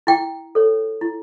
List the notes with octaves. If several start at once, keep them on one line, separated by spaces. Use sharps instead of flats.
E4 G5
A4 C#5
E4